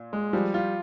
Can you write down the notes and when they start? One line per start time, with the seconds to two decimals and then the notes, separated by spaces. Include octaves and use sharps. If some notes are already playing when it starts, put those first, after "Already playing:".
Already playing: A#2
0.13 G#3
0.33 F3 G3
0.54 F4